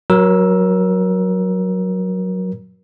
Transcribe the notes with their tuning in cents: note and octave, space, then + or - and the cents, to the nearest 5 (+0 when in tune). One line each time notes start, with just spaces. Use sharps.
F#3 -5 A#4 +25 E6 +0